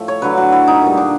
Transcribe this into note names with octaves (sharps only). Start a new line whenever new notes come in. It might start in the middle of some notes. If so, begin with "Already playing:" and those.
Already playing: A2 F3 A3
C#5
D3 F#3 A3 B4
F#4
E4
D#4
A#2 G3
D4